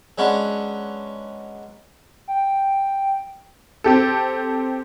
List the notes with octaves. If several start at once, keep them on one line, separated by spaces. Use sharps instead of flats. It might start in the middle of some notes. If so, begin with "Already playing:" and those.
F#3 G#3 B3 C#4 D4 F#4
G5
C4 G4 A4